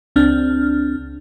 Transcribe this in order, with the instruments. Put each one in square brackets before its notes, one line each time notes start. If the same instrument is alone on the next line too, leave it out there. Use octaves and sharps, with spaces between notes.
[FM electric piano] C#2 C4 D4 F6